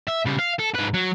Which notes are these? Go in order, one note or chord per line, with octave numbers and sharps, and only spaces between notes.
E5
C#3 G3
F5
A4
G#2 B4
F#3